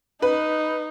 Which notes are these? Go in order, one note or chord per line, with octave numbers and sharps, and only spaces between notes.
D#4 B4